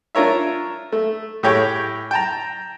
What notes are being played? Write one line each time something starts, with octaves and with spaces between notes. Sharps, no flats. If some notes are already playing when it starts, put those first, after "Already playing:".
D4 F4 A#4 C#5 E5
A3
A2 G4 G#4 C#5 G5 C#6
G5 A5 A#5